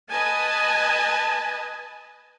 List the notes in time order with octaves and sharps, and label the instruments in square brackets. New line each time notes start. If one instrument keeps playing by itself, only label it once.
[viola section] B4 D#5 G#5 A5